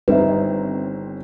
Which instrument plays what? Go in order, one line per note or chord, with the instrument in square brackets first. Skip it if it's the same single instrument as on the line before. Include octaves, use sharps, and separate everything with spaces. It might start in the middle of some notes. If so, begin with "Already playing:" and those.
[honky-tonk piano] G1 C4 C#5 [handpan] D#4 [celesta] B4 E5